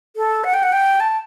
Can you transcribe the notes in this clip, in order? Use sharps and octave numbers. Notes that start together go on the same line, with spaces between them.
A4
F#5
G5
F#5
G5
A5